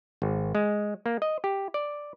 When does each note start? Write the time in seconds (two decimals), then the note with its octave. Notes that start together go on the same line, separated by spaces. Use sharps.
0.22 G#1
0.55 G#3
1.06 A#3
1.22 D#5
1.44 G4
1.74 D5